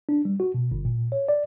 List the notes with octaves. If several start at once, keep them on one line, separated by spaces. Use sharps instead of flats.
D4
G3
F#4
B2
G1
A#2
C#5
D5